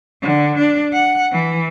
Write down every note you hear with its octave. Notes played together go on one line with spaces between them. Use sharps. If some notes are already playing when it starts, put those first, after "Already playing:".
D3
D4
F#5
E3